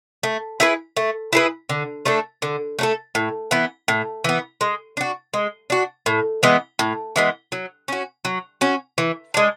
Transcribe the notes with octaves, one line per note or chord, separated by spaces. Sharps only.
A3
E4 G#4 B4
A3
E4 G#4 B4
D3
A3 D4 A4
D3
A3 D4 A4
A2
E3 B3
A2
E3 B3
G#3
D4 F#4
G#3
D4 F#4
A2
E3 G#3 B3
A2
E3 G#3 B3
F#3
C#4 F#4
F#3
C#4 F#4
E3
G#3 D4